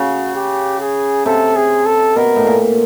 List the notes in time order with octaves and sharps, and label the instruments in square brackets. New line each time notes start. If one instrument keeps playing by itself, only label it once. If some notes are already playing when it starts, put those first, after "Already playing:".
Already playing: [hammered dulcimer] C#3 [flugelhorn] F#4
[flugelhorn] G4
G#4
[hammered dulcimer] C3 [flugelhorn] A4
[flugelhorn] G#4
A4
[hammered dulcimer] B2 [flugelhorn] A#4
[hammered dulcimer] A2
A#2